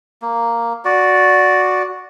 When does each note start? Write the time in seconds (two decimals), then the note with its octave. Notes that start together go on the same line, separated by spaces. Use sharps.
0.22 A#3
0.85 F#4 D5